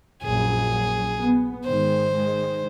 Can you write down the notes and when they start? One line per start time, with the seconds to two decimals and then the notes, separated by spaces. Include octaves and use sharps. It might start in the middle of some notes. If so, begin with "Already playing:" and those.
0.23 A#1 F#2 F#3 G#4
1.18 B3
1.65 G#2 D#3 G#3 C5
2.13 D#3 G#3